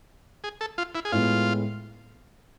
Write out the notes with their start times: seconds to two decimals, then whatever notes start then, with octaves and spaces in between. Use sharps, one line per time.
0.44 G#4
0.61 A4
0.78 F4
0.95 E4
1.05 G#4
1.12 A2 G#3 B3 F4